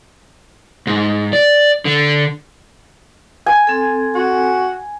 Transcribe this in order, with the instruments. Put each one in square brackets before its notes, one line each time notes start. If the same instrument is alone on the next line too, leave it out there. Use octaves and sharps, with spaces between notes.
[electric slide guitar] G#2
D5
D3
[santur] G#5
[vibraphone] C4 A4
[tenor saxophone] F#4